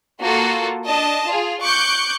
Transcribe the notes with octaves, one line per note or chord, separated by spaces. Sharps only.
A#3 F4 F#4 A4
D4 D#5 A5
F4 G#4
C#6 D6 F#6 G6 C#7